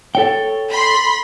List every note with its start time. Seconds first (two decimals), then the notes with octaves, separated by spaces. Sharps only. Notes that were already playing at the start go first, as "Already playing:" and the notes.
0.15 A4 C#5 G5
0.71 B5 C6